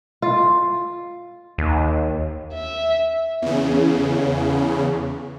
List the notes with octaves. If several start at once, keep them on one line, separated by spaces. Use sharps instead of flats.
F4
D#2
E5
E2 C#3